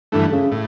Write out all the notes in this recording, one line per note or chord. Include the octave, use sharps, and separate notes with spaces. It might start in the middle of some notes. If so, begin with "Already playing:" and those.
G2 D3 E3 A3
C#3
A2